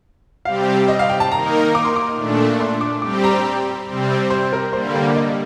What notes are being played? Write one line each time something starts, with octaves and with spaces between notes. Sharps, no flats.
C3 G3 C4 G4 F5
D#5
F5
G5
A5
D#3 A#3 D#4 A#4 A#5
D6
C6
D6
A#2 A3 D4
C6
D6
G3 C4 G4 D6
A#5
C3 G3 C4
C5
A#4
D3 G3 A#3 C5
D5
D#5